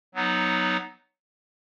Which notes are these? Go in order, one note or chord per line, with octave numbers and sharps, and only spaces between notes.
F#3 B3 D#4